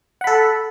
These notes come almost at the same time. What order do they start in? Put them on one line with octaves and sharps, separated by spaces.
F#5 B5 A4